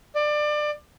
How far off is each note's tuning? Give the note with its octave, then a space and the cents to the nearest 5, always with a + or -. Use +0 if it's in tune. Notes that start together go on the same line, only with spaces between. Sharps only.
D5 +25